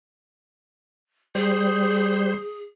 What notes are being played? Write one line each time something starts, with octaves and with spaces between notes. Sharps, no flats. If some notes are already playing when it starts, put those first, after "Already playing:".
G3 G#4 C5